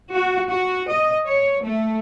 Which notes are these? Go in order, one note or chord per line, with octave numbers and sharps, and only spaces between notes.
F#4
F#4
D#5
C#5
A3